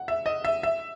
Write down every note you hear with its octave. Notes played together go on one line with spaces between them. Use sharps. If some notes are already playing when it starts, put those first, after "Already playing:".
Already playing: F#5
E5
D#5
E5
E5